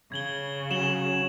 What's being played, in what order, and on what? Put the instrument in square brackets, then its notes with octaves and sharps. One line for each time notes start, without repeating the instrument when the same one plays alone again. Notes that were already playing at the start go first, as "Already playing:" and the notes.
[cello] C#3 [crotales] G#6 F#7 G7
[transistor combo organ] F#3 C#4 [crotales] E7 F#7 G7